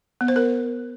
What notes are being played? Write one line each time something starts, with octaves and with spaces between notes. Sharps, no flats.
B3
C5
A#4